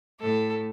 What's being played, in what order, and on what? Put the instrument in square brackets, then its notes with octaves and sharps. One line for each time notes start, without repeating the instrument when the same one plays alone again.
[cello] A2 [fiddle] A4